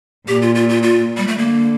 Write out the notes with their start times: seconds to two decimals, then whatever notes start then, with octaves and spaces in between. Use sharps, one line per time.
0.28 A#2 G4
0.42 F4
0.55 F4
0.69 F4
0.83 F4
1.17 G3
1.28 A3
1.37 D3 A#3